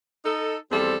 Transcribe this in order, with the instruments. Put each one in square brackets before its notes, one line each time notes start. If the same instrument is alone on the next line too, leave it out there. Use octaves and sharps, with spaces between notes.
[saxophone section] D#4 A4
E2 F3 G3 C4 A4